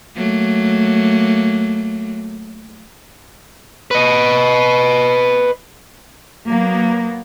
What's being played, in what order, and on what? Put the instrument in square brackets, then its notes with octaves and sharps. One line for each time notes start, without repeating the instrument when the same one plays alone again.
[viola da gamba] F#3 A3 A#3
[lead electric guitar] B4 D#5
[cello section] F#3 A#3 B3